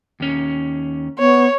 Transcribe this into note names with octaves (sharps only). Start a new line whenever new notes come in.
D#2 C#4
B3 C#5